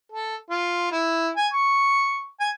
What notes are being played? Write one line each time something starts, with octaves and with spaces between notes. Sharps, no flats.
A4
F4
E4
G#5
C#6
G#5